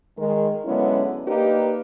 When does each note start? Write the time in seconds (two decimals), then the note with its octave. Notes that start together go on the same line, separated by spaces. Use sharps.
0.18 D#3 G#3 A#4
0.65 D3 F#3 G#3 B3 C#4 E4
1.26 A#3 D4 D#4 G4 A#4 B4